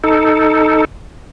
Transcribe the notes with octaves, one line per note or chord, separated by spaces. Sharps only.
D#4 A4